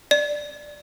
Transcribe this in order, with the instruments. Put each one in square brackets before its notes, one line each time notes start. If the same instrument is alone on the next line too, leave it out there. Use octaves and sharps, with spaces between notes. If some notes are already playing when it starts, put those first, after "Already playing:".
[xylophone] D5